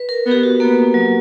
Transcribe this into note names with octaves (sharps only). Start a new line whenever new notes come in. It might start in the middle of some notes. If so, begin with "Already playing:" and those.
Already playing: B4
A#4
B3
G4
F#4
A#3 B3
F#3